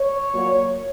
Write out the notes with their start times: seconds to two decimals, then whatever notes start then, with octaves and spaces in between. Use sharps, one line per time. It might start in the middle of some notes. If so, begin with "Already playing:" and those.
Already playing: C#5
0.33 A#2 F#3 A#3